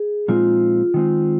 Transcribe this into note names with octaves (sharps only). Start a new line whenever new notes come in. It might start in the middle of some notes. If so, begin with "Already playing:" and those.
Already playing: G#4
A#2 F3 G#3 C4 D#4 F4
D#3 G#3 C4 D#4